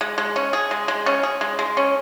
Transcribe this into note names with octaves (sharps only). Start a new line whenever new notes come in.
G#3
G#3
C#4
G#4
G#3
G#3
C#4
G#4
G#3
G#3
C#4